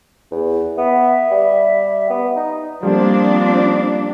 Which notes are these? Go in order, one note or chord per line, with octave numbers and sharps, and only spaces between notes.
E2
B3 E5
G3
B3
D#4
F3 G3 A#3 C4 D4